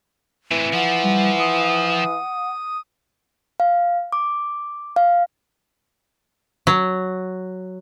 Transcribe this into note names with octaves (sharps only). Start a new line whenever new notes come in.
A2 C3 E3
F3 F#5
G3
D#6
F5
D6
F5
F#3